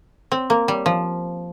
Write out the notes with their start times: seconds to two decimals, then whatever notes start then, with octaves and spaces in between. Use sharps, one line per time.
0.32 C4
0.50 A#3
0.68 G3
0.86 F3